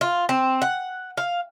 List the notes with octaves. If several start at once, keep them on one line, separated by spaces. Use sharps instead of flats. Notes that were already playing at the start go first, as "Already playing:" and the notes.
F4
C4
F#5
F5